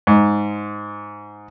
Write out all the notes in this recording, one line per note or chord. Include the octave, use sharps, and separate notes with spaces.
G#2